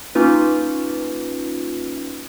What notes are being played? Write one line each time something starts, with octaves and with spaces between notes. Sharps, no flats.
A#3 C#4 D#4 F4 B4